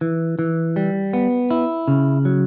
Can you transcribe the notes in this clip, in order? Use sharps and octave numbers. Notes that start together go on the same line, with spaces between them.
E3
E3
G3
B3
E4
C#3
F#3